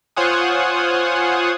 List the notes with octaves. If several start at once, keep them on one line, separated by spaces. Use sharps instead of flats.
F4 C5 C#5 F#5 G#5 D#6